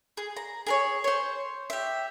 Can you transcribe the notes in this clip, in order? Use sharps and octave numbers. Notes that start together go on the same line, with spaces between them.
G#4
A#5
G#4 A#4 C#5
C5 C#5
G4 E5